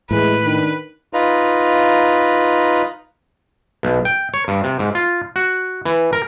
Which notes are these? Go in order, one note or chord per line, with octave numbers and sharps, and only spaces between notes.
A2 E3 G#3 B4
D#3 D4 D#4
D#4 F4 B4 A#5
B1
G5
C#5
G2
C3
G#2
F4
F#4
E3
A#4